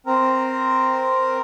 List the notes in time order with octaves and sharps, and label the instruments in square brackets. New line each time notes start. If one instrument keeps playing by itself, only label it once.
[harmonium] C4 A#4